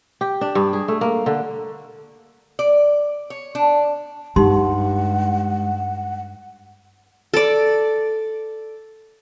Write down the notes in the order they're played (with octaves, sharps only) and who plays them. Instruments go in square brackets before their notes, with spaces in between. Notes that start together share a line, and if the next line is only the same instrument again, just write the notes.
[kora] G4
D4
G2
G#4
A3
A#3
D3
[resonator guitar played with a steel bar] D5
C#5
D4
[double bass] G2 [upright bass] G#3 [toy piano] D#4 G4 C6 [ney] F#5
[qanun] A4 D5